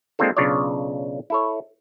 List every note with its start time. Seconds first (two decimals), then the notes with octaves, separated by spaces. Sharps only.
0.19 G#3 A#3 C4 D4 F4 A4
0.37 B1 C#3 D4 F4 C#5 D5
1.30 E4 A4 C#5